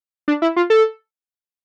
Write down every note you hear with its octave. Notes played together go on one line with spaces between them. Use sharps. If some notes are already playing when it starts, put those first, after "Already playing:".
D4
E4
F4
A4